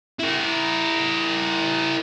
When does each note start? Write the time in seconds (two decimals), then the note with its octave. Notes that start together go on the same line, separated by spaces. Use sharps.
0.19 E4 A#4